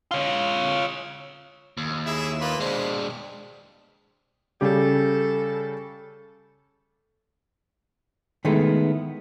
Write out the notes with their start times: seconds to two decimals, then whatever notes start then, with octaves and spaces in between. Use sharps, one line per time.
0.11 F4 C#5
1.77 D#2
2.06 E4 G#4 E5
2.41 A#3 F4 B4
2.60 G#3 D4 C5
4.61 C#3 G3 G4 A4
8.45 D#3 G#3 A3 B3 E4